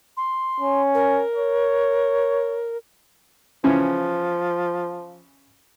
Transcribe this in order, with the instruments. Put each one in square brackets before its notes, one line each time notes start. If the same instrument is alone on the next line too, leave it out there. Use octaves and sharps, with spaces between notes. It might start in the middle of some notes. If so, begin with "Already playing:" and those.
[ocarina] C6
[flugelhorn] C#4
[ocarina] A#4
[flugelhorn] C#5
[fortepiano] C#3 E3 C#4 [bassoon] F3